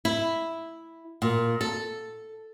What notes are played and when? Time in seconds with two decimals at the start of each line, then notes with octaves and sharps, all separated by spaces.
0.05 E4
1.22 A#2
1.61 A4